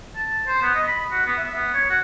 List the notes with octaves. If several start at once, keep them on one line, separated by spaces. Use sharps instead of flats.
A5
C5
B3
D#5
B5
F#4
B3
E5
B3
C#5
F#4